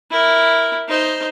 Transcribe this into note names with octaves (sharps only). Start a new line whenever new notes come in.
E4 A#4
D#4 C5